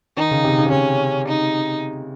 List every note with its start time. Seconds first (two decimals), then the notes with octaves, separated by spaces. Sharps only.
0.17 D#3 D#4
0.31 C#3
0.44 C3
0.58 C#3
0.66 C3
0.72 C#3 C#4
1.28 D#4